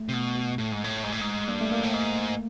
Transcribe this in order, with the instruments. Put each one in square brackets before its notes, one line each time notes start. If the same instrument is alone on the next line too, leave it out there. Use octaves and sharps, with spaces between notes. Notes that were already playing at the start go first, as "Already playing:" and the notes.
Already playing: [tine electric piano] A3
[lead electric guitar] C3
B2
A2
G#2
A2
G#2
A2
G#2
[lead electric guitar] G2 [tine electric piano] A#3
[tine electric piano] A3
A#3
[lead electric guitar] A2
G#2